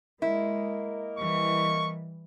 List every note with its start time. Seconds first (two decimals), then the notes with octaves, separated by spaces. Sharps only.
0.22 G#3 A#3 E4 A#4 D#5
1.19 E3 G3 C#6